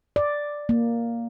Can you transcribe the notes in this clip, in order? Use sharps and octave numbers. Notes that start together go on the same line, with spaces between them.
D5
A#3